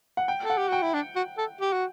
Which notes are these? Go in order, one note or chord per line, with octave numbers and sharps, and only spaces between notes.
F#5
G5
A4
F#5
G4
F#4 G5
E4
D4
F#4
A4
G4
F#4